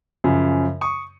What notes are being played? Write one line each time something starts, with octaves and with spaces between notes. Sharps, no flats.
F#2 C#3 F3
C#6 D#6